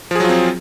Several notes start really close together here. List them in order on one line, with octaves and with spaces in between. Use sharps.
F3 G#4 F#3 F4 C4